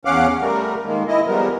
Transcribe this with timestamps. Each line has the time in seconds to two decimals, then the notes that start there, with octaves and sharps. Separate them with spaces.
0.05 E2 C#4 F5 F#5 D6
0.41 G3 A3 A#4
0.85 D#3 G#3 A#3
1.08 E4 D#5
1.27 C#3 F3 G3 B3 A#4